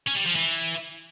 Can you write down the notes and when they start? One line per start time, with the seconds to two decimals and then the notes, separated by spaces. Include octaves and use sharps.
0.08 C#4
0.17 G3
0.26 F3
0.35 E3